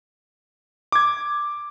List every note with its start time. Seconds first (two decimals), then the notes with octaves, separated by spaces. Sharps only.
0.92 D6 G#6